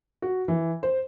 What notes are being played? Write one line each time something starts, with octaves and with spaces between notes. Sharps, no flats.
F#4
E3
C5